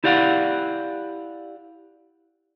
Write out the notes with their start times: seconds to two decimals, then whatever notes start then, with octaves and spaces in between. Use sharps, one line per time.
0.04 E4 G4 D5 F5 F#5